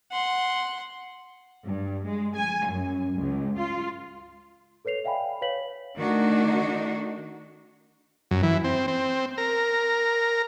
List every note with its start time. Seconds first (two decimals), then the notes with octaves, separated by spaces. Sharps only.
0.11 F#5 C6
1.65 G2
2.07 G#3
2.36 G#5
2.69 F#2
3.17 C#2
3.59 F4
4.85 A4 B4 C#5 C7 F7
5.04 D5 E5 F5 G5 G#5 B5
5.42 B4 C#5 F5 B6 F#7
5.98 D#3 A3 D4 D#4 F#4
8.31 F#2
8.43 E3
8.64 C4
8.88 C4
9.38 A#4